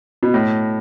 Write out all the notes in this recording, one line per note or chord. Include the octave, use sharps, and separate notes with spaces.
B2
A2